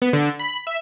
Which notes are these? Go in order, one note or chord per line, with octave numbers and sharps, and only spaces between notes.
B3
D3
B5
E5